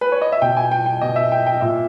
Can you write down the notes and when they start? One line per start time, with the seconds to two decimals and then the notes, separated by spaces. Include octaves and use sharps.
0.01 B4
0.12 C#5
0.22 D#5
0.32 E5
0.42 B2 G5
0.57 G#5
0.72 G5
0.86 G5
1.02 B2 D#5
1.16 E5
1.32 G5
1.46 G5
1.61 A#2 E5